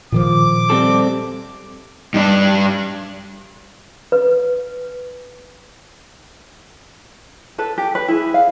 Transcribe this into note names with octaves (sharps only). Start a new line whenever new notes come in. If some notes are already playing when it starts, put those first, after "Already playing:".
A#2 D#3 F3 D6
G3 C4 A4
G2 D4
B4
A4 B4
G4
B4
E4 G#4
F5